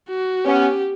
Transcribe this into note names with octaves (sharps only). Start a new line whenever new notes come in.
F#4
B3 C#4 G4